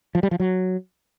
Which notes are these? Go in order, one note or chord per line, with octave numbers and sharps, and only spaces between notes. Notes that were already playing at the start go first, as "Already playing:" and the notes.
F3
G3
F3
F#3